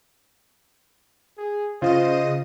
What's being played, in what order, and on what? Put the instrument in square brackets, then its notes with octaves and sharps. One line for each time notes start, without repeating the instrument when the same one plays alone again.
[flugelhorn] G#4
[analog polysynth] C#3 D#5 D#7 [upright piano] F4 [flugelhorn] C5